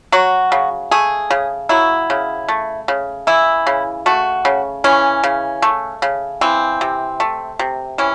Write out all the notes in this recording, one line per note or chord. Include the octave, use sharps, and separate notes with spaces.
F#3 F#4
C#3
A3 G#4
C#3
F#3 E4
C#3
A3
C#3
E3 E4
C#3
A3 F#4
C#3
E3 C#4
C#3
A3
C#3
E3 C4
C3
A3
C3
E3 C#4